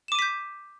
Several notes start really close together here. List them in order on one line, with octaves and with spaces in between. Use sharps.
E7 D6 D#7 B6 G6